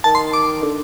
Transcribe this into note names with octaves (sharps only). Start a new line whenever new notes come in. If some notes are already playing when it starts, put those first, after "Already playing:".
D#3 A5
C6
D6
D3